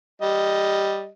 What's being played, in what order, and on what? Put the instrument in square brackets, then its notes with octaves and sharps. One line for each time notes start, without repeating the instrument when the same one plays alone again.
[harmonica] G3 D#5